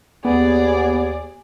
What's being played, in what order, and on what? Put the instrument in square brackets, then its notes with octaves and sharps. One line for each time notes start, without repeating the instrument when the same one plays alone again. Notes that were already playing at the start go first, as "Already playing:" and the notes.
[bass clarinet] D#2 [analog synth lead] B3 [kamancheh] G#4 D5